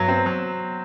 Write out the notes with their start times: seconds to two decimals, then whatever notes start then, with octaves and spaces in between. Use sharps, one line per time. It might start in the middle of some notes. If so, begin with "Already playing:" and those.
Already playing: G2 F#3
0.08 C4
0.26 F#3